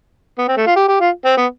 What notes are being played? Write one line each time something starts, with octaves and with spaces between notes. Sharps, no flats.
B3
C4
A3
F4
G4
G4
F4
C4
B3